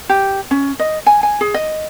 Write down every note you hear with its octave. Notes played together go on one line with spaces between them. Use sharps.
G4
C#4
D#5
G#5
G#5
G#4
D#5